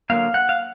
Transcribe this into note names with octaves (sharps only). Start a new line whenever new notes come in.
D3 F#3 A#3 F5
F#5
F5